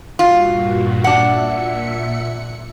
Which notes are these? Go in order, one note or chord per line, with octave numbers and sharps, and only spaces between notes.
G2 A#2 F4 F#4
A#2 D4 E5 F#5 C#7